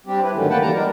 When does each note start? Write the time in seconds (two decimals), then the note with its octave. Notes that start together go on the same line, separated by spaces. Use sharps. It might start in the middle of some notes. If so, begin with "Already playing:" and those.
0.07 G3 C4 D4 G4
0.22 E4 B4
0.35 G2 D3 D#3 F#3 A3 C#4
0.50 C#3 A#3 B4 F#5 G5 A5
0.62 E3 G3 A5 A#5
0.73 G#3 D4 A#4